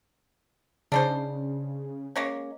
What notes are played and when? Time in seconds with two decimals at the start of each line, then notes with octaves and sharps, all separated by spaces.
0.92 C#3 D4 D#4 C5
2.16 G#3 A#3 C#4